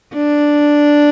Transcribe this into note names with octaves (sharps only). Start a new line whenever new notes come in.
D4